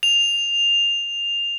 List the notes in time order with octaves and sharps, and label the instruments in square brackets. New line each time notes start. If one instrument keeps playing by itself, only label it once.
[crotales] F7